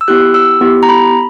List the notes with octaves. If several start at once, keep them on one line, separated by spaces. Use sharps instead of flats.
E6
B3 E4 G4 F#6
E6
B3 E4 G4
A#5
B5